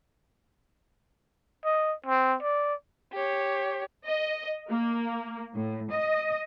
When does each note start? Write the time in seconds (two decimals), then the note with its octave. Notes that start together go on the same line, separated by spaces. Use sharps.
1.65 D#5
2.06 C4
2.43 D5
3.13 G4 C#5
4.05 D#5
4.70 A#3
5.54 A2
5.91 D#5